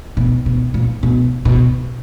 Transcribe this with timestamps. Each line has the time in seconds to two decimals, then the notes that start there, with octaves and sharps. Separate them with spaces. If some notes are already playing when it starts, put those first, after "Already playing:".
0.17 B2
0.46 B2
0.74 A#2
1.03 B2
1.45 B2